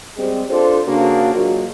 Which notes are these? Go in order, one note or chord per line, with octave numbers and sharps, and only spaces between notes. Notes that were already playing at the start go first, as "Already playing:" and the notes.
G3 G#3 C4
D4 F4 A4 C5
C#3 A#3 D4 F#4
F#3 G#3 A#3 F4 F#4